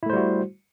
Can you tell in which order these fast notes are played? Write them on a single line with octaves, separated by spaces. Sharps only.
E4 A3 C5 G3 F#4